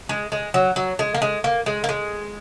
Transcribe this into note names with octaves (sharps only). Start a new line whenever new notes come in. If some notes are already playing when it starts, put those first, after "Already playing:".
G#3
G#3
F#3
F#3
G#3
A#3
G#3
A#3
G#3
A#3
G#3